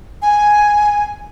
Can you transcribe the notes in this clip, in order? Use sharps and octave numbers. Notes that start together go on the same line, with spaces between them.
G#5